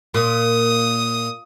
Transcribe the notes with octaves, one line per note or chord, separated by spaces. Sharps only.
A#2 D#6